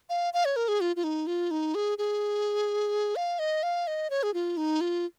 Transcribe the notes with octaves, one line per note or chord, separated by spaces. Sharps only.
F5
F5
C#5
A#4
G#4
F4
F4
D#4
F4
D#4
G#4
G#4
F5
D#5
F5
D#5
C#5
G#4
F4
D#4
F4